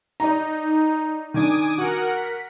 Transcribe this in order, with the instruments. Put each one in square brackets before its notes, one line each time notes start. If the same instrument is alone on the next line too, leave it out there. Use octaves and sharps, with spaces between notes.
[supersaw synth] D#4 [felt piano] D5 A#5
[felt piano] D#3 D4 [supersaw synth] G#5 D6 D#6
[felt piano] F#4 [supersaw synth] A#4 F#5
[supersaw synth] B6